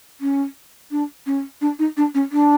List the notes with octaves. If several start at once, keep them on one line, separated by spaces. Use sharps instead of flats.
C#4
D4
C#4
D4
D#4
D4
C#4
D4